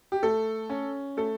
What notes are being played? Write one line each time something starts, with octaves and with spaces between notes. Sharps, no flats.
G4
A3 A4
C#4
A3 A4